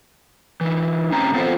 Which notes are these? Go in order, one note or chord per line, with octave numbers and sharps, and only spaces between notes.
E3 D#4
A2 C4 C#4 A#5
B3 C4 F4 A4 C5